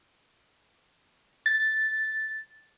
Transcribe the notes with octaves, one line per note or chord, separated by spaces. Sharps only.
A6